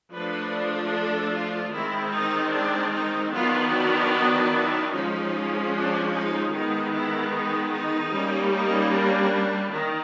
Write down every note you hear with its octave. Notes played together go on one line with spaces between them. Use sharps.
F3 A3 D4 B4
A4
F4
D#3 G#3 C4 E4
D#4
D4
D#4
D#3 F#3 B3 D4 F4
F#4
F#4
E4
F3 G#3 C#4 D#4
D4
D#4
D#3 G#3 B3 D#4
E4
D#4
D#4
G3 A#3 C#4
D#4
D4
D#3